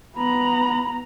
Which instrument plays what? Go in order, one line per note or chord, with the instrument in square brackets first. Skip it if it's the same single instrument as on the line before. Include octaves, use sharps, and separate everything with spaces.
[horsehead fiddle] B3 A#5 [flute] B5